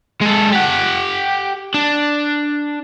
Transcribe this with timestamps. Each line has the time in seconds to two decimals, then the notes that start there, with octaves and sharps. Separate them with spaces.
0.22 G#3 A4
0.53 G4 F#5
1.74 D4